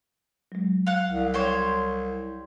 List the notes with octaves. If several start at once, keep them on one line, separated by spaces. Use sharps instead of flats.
F#3 G#3
F5 F#5
C2
G4 C5 C#5